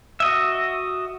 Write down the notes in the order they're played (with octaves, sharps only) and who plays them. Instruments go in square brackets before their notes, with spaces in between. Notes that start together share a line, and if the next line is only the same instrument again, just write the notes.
[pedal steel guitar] F#4 D#5 E5